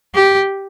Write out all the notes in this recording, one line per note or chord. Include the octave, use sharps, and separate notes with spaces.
G4